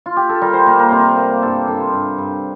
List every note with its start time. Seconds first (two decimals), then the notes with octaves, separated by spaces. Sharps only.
0.06 F4
0.17 G4
0.29 A4
0.42 G3 A#4
0.53 C5
0.66 A#3 A#4
0.79 A#4
0.89 C3 C5
1.00 A#4
1.17 A#3
1.43 G2 A4
1.68 G2 A4
1.76 A#4 C5
1.93 G2
2.18 G2